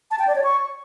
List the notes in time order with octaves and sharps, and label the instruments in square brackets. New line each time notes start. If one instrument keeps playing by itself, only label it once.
[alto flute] A5
G5
D5
C#5
C#6